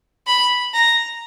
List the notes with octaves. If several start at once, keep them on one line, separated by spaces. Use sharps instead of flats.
B5
A#5